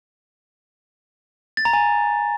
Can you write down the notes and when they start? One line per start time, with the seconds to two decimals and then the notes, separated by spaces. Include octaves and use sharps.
1.57 A6
1.65 A#5
1.73 G#5